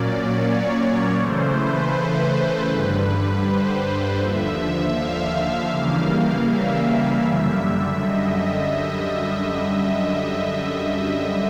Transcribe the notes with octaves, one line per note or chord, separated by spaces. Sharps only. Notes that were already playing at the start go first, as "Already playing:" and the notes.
Already playing: A#2 F#3 A#3 C#4 D5
C#5
C#3 E3 A3 C5
B4
G2 D3 G3
C5
D#2 D3 F3 E5
F5
C#3 E3 G3 A#3
E5
F#2 D3 G3
D#5